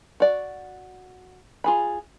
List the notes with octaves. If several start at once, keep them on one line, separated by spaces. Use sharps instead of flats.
F#4 D5
F4 G#4 B5